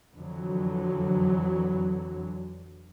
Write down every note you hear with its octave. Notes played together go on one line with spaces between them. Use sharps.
F2 D3 E3 F#3